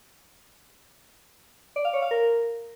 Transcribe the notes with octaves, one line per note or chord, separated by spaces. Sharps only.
D5
F5
C#5
F5
A#4